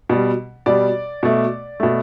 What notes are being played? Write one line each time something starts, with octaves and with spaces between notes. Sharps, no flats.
B2 G3
B2 G3 D5
B2 A3
B2 A3